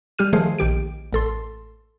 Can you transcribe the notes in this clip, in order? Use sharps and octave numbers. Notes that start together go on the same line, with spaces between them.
G3 G4 F6 D#7
D#3 F3 A3 G#4 C5
A#1 D#3 G4 D7
A1 A4 C6